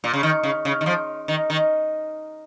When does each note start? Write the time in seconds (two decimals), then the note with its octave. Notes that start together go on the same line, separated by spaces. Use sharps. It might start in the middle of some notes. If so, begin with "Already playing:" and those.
0.04 A#2
0.14 C#3
0.23 D#3
0.43 C#3
0.65 C#3
0.81 D#3
0.86 F3
1.28 D#3
1.50 D#3